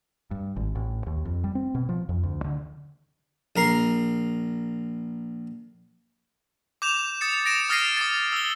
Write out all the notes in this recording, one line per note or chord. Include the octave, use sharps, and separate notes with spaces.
G2
G#1
A1
D#2
F2
G3
C4
B2
F3
F2
D2
D3
A#1 A#4 A#5 C6
D6 G6 E7 F7
D#6 A6 C#7
A#6 D7 E7
D#6 F6 A6 A#6 C7 D#7
D#6 A6
E6 G7